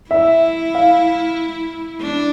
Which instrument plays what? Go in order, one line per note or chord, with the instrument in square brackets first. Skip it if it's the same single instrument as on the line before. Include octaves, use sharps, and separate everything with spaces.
[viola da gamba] E4 [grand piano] E5
[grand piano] F5
[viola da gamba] D4